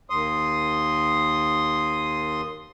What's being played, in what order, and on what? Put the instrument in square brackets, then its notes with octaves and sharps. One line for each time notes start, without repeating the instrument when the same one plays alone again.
[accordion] D#2 C6 D#6